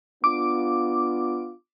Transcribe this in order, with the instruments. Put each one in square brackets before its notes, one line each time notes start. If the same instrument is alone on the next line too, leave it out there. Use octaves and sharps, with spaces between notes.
[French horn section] B3 D4 F4 [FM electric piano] D6